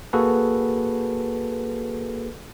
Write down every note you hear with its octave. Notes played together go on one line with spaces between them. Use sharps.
A#3 F#4 G#4 A4 B4